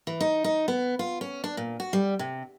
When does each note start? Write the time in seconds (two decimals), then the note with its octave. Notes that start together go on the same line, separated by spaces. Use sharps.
0.07 E3
0.21 D#4
0.44 D#4
0.68 B3
0.99 F4
1.21 C#4
1.44 D4
1.57 A#2
1.80 F#4
1.93 G3
2.19 C3